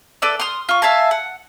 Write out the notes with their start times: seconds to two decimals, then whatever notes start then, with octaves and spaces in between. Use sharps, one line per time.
0.22 A4 B4 D5 E6
0.40 C6 D#6 F6
0.69 F4 C#6
0.82 E5 F5 G#5 A5
1.11 F#5